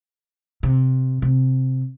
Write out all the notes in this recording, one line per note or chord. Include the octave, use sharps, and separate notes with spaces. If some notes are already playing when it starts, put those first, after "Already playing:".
C3
C3